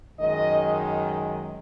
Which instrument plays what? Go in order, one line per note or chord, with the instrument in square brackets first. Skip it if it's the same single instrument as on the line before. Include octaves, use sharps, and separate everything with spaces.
[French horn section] F#2 D#3 G#3 D#5